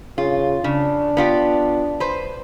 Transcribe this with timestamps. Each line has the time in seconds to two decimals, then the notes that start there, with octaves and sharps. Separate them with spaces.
0.18 C#3 F4
0.64 C#3 D4
1.17 B3 F4 G4
2.00 B4 C5